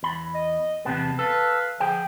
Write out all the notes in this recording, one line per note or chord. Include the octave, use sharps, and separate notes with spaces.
E2 B5
D#5
E2 C3 B3 A5
A4 B4 F5
D3 F3 G#4 G5